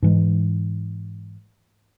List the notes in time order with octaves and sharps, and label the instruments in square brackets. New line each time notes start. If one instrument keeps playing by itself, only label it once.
[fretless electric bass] G#2 E3 G#3